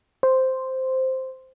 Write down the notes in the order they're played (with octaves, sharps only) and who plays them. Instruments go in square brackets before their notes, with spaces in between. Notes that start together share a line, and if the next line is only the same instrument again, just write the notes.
[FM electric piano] C5